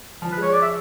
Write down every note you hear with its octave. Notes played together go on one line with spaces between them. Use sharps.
F3
B4
G#3 C#5
D5
E5